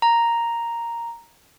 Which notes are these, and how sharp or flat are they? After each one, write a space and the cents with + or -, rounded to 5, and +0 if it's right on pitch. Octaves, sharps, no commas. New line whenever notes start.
A#5 +0